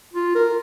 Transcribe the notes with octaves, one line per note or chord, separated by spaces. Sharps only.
F4
A#4